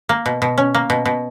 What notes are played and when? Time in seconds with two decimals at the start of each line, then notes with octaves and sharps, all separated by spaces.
0.09 A#3
0.26 B2
0.42 B2
0.58 C#4
0.75 A#3
0.90 B2
1.05 B2